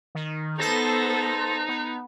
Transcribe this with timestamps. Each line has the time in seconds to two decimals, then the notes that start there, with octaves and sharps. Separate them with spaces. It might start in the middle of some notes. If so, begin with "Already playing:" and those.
0.15 D#3
0.59 B3 D#4 A4 C5 A5 A#6
1.69 B3